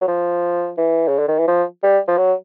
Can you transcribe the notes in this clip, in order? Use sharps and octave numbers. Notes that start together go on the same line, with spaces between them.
F#3
F3
E3
C#3
D3
D#3
E3
F3
G3
F3
F#3